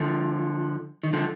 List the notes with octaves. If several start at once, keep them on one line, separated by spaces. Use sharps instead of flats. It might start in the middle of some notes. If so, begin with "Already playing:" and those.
Already playing: D3 F3
D#3
D3 F3